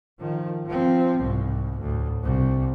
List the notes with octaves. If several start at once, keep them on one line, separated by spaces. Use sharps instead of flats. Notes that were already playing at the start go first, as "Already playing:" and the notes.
D#3 F3
F3 C4
C2 G#2
D2 A2
C2 C3